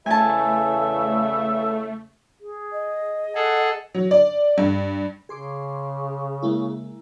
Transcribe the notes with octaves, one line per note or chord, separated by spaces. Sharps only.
E2 C#3 A3 E5 G#5 A5
G#4
D#5
G#4 A4 F#5
F#3
D5
G2
C#3 G#4 C6 D6
G#3 A#3 E4